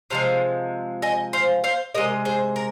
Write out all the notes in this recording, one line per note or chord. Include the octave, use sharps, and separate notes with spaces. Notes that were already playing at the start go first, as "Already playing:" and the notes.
C3 F3 G#3 C5 F5
D#5 G#5
C5 F5
C5 F5
C3 G#3 A#4 D#5
G#4 C5
A#4